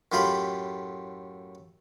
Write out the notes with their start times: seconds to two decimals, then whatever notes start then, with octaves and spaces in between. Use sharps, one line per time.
0.12 F#2 A2 F4 G4 B5